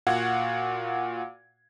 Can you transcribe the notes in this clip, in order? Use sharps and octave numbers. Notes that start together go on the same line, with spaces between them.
A#2 F#4 F5 F#5 G#6